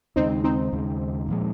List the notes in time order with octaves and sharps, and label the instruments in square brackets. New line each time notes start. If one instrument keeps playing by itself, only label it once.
[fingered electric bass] D#2 C#3 G#3 [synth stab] C4 D#4
[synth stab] C4 D#4
[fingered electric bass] D#2 C#3 G#3
A#2 F3 G#3